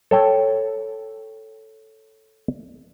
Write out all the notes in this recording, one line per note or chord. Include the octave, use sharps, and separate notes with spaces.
A4 C#5 G5